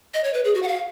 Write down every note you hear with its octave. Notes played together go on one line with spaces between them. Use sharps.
D#5
C#5
B4
G#4
F#4
F#5
F5